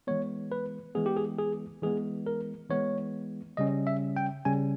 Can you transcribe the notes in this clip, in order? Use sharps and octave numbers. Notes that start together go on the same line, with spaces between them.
E3 G#3 B3 C#5
B4
E3 G#3 B3 G#4
G4
G#4
G#4
E3 G#3 B3 G#4
A#4
E3 G#3 B3 C#5
C#3 G3 C#4 D#5
E5
G5
C#3 G3 C#4 G#5